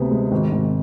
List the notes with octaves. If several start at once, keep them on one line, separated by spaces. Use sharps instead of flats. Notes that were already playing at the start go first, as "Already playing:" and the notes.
Already playing: D2 C3 B3
G#3
G#1
G#1